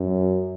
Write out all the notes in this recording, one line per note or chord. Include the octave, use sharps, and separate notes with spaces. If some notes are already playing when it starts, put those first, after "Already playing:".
Already playing: F#2